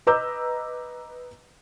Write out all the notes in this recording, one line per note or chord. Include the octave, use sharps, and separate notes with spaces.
B4 D#5 A#5 D6 E6 G6